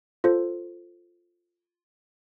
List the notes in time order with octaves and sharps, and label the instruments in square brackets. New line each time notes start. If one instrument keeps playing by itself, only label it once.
[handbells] F4 A4 C5